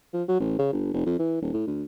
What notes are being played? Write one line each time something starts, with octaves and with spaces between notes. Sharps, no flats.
F3
F#3
A1
C#3
G1
F1
F2
E3
D#1
A2
D2